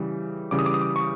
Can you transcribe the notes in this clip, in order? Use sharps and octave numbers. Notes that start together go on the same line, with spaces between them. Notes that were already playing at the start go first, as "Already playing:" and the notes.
Already playing: C#3 E3 G3
C#3 E3 G3 D6
D#6
D6
D#6
D6
C#6